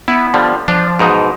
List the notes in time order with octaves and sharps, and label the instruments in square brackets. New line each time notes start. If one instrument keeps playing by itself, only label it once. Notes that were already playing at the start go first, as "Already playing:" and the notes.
[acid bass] B3 [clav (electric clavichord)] E4
[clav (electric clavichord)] D3 F3 G3
[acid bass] F3 [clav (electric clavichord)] D4
[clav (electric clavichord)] G#2 B2 D#4